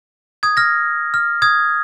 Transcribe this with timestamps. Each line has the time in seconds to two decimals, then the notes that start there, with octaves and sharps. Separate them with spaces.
0.43 D#6 G#6
0.57 F6 A#6
1.14 F6
1.42 D#6 G#6